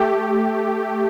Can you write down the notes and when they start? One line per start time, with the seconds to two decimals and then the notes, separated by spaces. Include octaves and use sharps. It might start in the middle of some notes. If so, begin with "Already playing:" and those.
Already playing: A3 G4